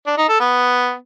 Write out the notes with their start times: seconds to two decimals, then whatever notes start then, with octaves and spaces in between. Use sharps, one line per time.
0.06 D4
0.17 D#4
0.29 A4
0.40 B3